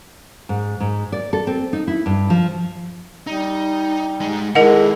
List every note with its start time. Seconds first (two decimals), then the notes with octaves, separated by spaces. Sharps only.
0.49 G#2
0.80 G#2
1.12 D5
1.33 A4
1.47 C4
1.73 D#4
1.88 E4
2.06 G2
2.30 F3
3.27 G3 D#4
4.20 G#3 D#4
4.55 D#3 G#3 E4 A4 A#4 D#5 F#5